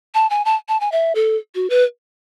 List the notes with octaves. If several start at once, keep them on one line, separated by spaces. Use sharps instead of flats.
A5
G#5
A5
A5
G#5
E5
A4
F#4
B4